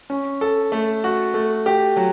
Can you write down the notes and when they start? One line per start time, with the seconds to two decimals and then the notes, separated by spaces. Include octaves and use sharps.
0.10 C#4
0.41 A4
0.72 A3
1.04 F#4
1.34 A3
1.66 G4
1.96 F#3